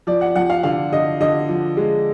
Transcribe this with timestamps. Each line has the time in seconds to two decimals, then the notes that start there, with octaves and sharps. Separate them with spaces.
0.07 F3 D5
0.21 F#5
0.36 F3 F#5
0.50 F5
0.63 D3 F5
0.92 D3 D#5
1.20 D3 D#5
1.49 F3
1.77 G#3